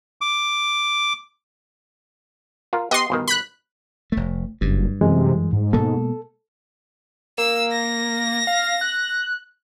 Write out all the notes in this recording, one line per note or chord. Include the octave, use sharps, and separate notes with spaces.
D6
F4 A#4
B3 G4 D#5 C6
G1 B2 D#3
B5 F#6
F1 A3
F#1 G2
F#2 C3 E3 G#3
G#2
B2 G#3 A#3 A4
A#3 E6
A#6
F5
F#6